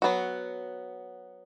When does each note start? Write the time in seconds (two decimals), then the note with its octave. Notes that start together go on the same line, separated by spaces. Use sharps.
0.02 F#3 B3 F#4